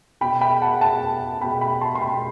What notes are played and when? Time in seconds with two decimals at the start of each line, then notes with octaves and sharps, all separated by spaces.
0.21 B2 G5 B5
0.41 G5 B5
0.62 F#5 A5
0.81 B2 F#5 A5
1.41 B2 G5 B5
1.61 G5 B5
1.81 A5 C6
1.95 C6
2.01 B2 G5 B5